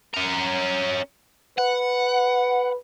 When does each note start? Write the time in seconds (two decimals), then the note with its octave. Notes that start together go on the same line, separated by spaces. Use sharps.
0.14 C#4 A#4
1.58 B4 F#5